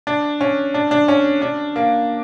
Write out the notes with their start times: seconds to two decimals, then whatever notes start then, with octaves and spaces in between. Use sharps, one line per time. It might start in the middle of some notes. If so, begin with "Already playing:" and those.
0.07 D4
0.41 C#4
0.74 D4
0.91 D4
1.08 C#4
1.42 D4
1.76 A#3